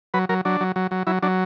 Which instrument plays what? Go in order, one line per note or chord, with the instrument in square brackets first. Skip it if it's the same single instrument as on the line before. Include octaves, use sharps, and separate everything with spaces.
[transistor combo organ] F#3 B4
F#3 A#4
F#3 D4
F#3
F#3
F#3
F#3 E4
F#3 D4